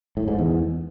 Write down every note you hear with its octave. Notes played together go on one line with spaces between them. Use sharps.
A2
G#2
E2